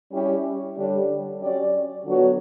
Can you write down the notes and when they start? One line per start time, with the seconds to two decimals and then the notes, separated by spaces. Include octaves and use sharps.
0.11 G3 C#4 E4 G4
0.76 D3 G3 D4 G4 C#5
1.40 F#3 C#4 G4 D5
2.05 D3 F#3 B3 F#4 C#5